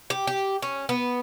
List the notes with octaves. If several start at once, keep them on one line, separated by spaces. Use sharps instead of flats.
G4
G4
C#4
B3